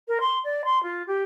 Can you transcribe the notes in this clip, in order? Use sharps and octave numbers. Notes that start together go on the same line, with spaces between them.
A#4
C6
D5
C6
F4
G4